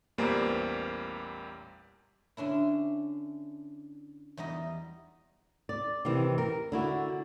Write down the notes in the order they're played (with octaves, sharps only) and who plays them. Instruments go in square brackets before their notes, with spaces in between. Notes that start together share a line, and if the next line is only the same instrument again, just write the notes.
[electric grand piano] A1 E2 A#2 G3 A#3 C5
[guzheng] D3 C#4 D4 E4
E2 G3 D#4 D#5
[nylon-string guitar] D5
C3 D#3 E3
A#4
D3 E4 F#4